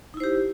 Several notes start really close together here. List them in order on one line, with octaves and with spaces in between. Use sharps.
D#4 E4 C5 G4